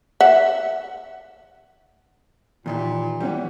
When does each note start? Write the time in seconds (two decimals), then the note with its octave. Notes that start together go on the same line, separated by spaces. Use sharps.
0.21 E5 F#5
2.66 D#2 A#2 D#3 E3
3.20 E3 G3 B3 C#4